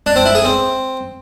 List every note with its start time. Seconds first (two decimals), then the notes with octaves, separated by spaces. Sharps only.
0.06 D4
0.16 C4
0.25 E4
0.35 G#4
0.45 C4